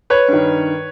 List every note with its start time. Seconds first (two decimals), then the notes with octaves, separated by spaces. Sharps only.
0.10 B4 C#5
0.28 G2 D#3